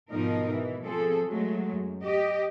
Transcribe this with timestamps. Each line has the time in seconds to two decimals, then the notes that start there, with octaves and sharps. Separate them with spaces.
0.11 G#2 B2 F3 D#4 A#4
0.52 E3
0.84 F3 C4 G#4 A4
1.27 F#3 G#3 A3
1.71 F#2
2.01 G4 D#5